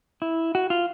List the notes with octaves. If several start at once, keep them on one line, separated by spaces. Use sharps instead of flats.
E4
F#4
F4